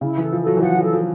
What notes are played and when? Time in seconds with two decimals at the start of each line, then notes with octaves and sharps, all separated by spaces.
0.01 C#3 E4
0.17 E3 A4
0.32 F3
0.42 F#3 A4
0.57 E3
0.62 F3 F#5
0.77 F3
0.83 A4
0.93 F3